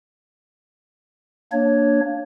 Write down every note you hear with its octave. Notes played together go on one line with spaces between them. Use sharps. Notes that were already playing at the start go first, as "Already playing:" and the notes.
A#3 D4 C#5